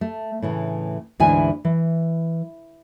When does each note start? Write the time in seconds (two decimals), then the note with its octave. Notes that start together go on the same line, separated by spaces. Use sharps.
0.01 A3
0.42 A2 C#3 E3
1.20 D2 G#2 E3 E4 G#4 G#5
1.65 E3